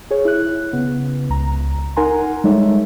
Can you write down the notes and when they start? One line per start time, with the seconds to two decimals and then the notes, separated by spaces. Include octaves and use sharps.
0.11 G#4 C#5
0.25 E4 F#6
0.73 C#3 B3
1.30 C#2 A#5
1.96 D#4 A#4 F#5 G#5 A#5 C6
2.44 G3 G#3 D#4 A4 C#5 E5